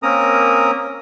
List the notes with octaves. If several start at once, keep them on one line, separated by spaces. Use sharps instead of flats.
A#3 C4 C#4 A#4 A#5 D#6